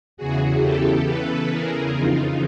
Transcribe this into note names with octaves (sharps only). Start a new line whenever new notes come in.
E2 C#3 E3 F#4 G#4
G4 A4
A4 B4
G#4 A#4
F2 C#3 E3 D#4 F4